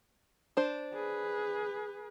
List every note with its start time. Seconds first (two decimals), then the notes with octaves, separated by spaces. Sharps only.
0.57 D4 C5
0.93 G#4 B4